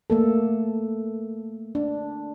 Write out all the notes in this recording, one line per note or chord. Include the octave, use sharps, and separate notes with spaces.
A3 A#3 A4
D4